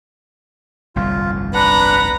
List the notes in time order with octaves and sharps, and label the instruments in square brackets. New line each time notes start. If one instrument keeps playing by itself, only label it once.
[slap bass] G1 C2 F2 [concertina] F4
[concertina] D4 F#5 [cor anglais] B4 [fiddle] A#5 B5